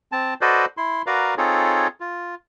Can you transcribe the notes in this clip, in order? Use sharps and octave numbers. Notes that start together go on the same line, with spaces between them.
C4 A5
F#4 A4 B4 C5 D5 D#5
E4 C6
F#4 A#4 B4 D5 F5 A#5
C4 D#4 F4 G#4 A4 C#5
F4